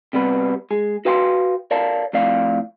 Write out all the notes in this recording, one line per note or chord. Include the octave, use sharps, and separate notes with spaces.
C3 G3 B3 B4
G#3 G#4
F#4 B4 F5 G5 A5 C6
A#4 C#5 D5 F5 A5
F2 A2 D5 F5